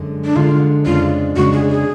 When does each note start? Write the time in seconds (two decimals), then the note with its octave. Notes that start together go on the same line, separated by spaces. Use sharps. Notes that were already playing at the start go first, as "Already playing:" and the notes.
Already playing: F#2 D3 G#3
0.24 D4
0.35 F#2 D3 G#3 F4
0.86 F2 C#3 G#3 D4 F4
1.36 F2 C#3 G#3 D4 F#4
1.53 G#4
1.70 G#4